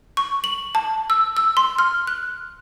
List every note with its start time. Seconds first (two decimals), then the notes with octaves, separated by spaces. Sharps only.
0.17 C#6
0.44 F#7
0.75 A5
1.10 E6
1.37 E6
1.57 C6
1.79 F6
2.07 F#6